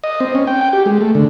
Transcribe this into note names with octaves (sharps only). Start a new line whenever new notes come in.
D#5
C4
C#4
G5
G5
G4
G#3
A3
D3